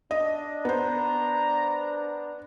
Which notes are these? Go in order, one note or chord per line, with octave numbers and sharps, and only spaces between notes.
D4 D#5
B3 C5 A#5